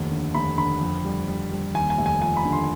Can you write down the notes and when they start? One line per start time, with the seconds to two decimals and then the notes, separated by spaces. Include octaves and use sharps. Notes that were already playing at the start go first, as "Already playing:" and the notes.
Already playing: F1 D#2
0.11 D3
0.35 F1 B5
0.58 D3 B5
0.81 F2
1.05 G3
1.28 G3
1.52 G3
1.75 D#2 G#5
1.90 G#5
1.98 F1
2.06 G#5
2.22 F3 G#5
2.37 B5
2.45 D3
2.53 C6